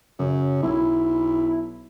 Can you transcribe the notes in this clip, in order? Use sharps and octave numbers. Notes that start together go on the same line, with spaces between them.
F#2 C#3
B1 E4